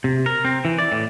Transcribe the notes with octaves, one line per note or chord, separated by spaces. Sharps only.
C3
A#4
C4
E3
D5
A2